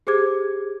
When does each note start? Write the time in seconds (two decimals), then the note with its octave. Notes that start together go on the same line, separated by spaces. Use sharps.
0.07 G4 G#4 C5 D6 G#6